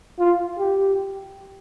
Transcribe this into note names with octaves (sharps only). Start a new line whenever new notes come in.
F4
G4